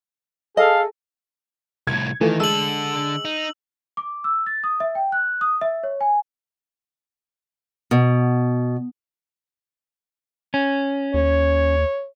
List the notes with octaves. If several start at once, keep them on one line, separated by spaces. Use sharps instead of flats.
G#4 A4 D#5 F5
C2 A2 G#6
D#3 E3 A3 F4
D3 G#3 A4 E6 F#7
D#4
D6
E6
A6
D#6
E5
G5
F#6
D#6
E5
C#5
G#5
B2
C#4
D#2 C#5